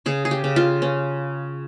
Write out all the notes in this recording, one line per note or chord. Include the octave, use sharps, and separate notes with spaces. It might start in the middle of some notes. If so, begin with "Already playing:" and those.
C#3 G#4
G#4
G4
C#3
F4
C#4